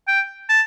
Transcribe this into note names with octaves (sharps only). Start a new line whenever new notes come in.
G5
A5